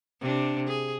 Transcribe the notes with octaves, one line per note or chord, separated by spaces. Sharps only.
C3 D4
G#4